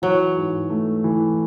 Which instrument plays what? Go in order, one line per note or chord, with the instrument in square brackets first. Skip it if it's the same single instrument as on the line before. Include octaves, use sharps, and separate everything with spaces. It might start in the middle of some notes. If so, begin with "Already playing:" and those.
[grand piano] E3 [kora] F#3
[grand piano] G#2
A3
E3